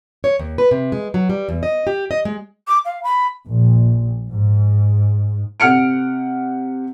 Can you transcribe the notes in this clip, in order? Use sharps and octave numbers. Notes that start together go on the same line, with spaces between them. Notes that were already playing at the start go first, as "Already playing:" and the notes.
C#5
D#2
B4
C3
G#3
F#3
G3
E2
D#5
G4
D#5
G#3
D6
F5
B5
A#1
G#2
C3 F#5 F6 C#7 D7